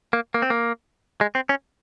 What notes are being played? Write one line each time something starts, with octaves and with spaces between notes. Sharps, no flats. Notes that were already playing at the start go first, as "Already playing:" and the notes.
A#3
A#3
C4
A#3
G#3
C4
C#4